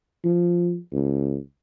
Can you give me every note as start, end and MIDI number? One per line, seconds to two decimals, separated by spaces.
0.24 0.78 53
0.93 1.37 37